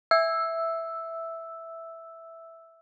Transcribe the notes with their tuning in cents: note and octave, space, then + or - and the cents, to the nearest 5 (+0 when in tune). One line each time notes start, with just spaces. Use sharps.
E5 +0 E6 +0